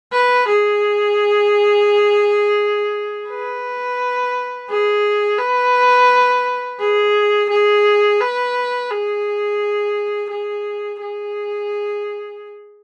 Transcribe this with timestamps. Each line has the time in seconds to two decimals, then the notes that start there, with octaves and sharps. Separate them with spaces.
0.13 B4
0.48 G#4
3.29 B4
4.69 G#4
5.39 B4
6.80 G#4
7.50 G#4
8.20 B4
8.90 G#4
10.31 G#4
11.01 G#4